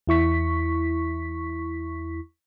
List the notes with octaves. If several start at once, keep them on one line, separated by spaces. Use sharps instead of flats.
E2 E4 C#6 B6